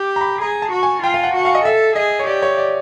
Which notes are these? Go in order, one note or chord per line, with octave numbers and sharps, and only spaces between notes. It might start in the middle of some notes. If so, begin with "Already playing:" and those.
Already playing: G4
A#5
B5
G#4 A#5
A5
F#4
G#5
F4 G5
F5
F#5
F#4
F5
D#5
A4 E5
G#4 D#5
C#5
G4 D5
C#5
D5